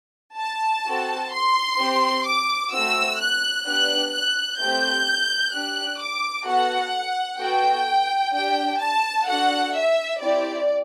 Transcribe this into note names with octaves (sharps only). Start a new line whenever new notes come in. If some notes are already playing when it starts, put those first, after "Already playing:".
A5
C4 F#4 A4
C6
C4 G4
D6
A3 C4 F#4 E6
F#6
B3 D4 G4 F#6
F#6
A3 C4 G4 G6
D4 G4 F#6
D6
B3 F#4 A4 F#5
B3 F#4 A4 G5
D4 G4 G5
A5
D4 F#4 A4 F#5
E5
C4 E4 G4 D5